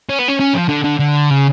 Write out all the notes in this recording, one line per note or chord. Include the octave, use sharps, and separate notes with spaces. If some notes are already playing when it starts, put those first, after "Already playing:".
C#4
B3
C#4
C#4
F3
D3
D3
D3
C#3